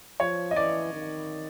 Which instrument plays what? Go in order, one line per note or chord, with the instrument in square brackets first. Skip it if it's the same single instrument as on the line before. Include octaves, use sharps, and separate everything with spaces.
[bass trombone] F3 [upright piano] C#5
[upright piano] D#5
[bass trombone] E3 [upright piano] D5
[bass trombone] D#3